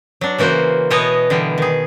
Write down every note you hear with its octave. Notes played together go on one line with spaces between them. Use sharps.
F#3 D4
C#3 E3 A#3 F#4 C5
B2 E3 B3 C#5 D#5
D3 E3 G3
D#3 G#4